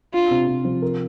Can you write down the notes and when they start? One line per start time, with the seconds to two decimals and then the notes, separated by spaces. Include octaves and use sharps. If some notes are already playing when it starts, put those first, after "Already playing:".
0.13 D4 F4
0.31 C3
0.47 C3
0.65 F3
0.82 A#4